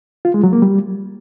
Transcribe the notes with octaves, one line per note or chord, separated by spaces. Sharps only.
F4
G#3
F#3
A#3
G3